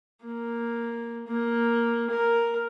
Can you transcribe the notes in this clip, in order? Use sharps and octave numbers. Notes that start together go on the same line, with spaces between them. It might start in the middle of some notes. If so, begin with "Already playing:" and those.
A#3
A#3
A#4